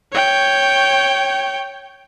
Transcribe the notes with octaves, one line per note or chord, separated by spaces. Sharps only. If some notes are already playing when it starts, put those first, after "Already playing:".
C#5 G5